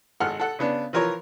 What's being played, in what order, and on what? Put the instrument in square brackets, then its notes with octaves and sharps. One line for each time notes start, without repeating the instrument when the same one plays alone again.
[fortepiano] G#1 A4 F#5 F6
A4 F#5
C#3 B3 D4
E3 F3 A#4 C#5